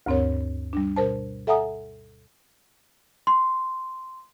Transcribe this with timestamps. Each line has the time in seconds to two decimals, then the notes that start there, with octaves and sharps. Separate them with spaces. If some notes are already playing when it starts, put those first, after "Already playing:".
0.06 D2 G2 C4 A#4 C#5
0.73 G3 D4
0.96 B2 A#4 C5 A5
1.47 A4 E5 F#5 G#5 A#5 D#6
3.27 C6